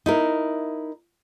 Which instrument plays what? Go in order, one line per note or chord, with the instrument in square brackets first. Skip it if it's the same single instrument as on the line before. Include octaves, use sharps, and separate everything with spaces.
[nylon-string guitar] D#4 E4 A#4